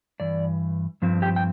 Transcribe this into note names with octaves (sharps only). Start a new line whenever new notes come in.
G2 E3 D5
G2 F3 C4
G4 G5
G5